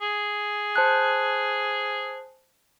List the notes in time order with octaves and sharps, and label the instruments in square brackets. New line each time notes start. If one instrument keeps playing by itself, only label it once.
[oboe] G#4
[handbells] C5 A5 F#6